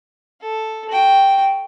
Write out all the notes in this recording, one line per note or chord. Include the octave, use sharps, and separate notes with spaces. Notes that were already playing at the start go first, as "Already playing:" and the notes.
A4
F#4 G5